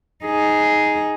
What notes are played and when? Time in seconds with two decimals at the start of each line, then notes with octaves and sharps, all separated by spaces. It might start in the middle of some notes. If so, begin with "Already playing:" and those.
0.25 D#4 G#4